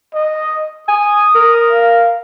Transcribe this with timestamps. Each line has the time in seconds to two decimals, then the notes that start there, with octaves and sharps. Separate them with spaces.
0.14 D#5
0.88 G#5 D#6
1.35 A#4
1.71 F5